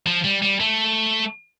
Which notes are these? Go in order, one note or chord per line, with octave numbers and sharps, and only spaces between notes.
F3
G3
G3
A3